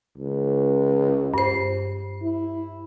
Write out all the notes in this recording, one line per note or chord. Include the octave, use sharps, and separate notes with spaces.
C#2
G2 C5
E4